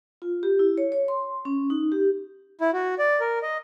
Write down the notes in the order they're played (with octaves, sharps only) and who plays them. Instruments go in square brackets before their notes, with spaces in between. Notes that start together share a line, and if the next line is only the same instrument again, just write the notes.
[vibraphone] F4
G4
E4
C#5
C#5
C6
C#4
D#4
G4
[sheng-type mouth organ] E4
F#4
D5
A#4
D#5